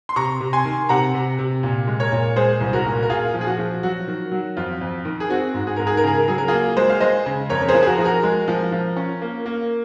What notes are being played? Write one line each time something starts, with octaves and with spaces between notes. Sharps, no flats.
C6
C3 A#5 C#6
C3
G#5 C6
D#3
C3 F#5 A#5
C3
C3
A#2
G#3
A#4 C#5
A#2
G#3 G#4 C5
C2
F#4 A#4
A#2
A#4
A#2 F4 G#4
F3
G#4
F#4
F3
F#3 F#4
D#3
F#3
F2 F4
F2
D#3
G#4
C4 F#4
G#2
G#4
G#2 A#4
G#4
A#4
C#3 G#4
A#4
F#3 G#4
A#4
A#3 F4 G#4
G#3 G#4 C5
F5
G#3 C5 D#5
C#3
F2 A#4 C#5
A#4
G#4 C5
F3
G#4
F#4 A#4
F3 G#4
F#4 A#4
G#3
F3
F3
C#4
A#3
A#3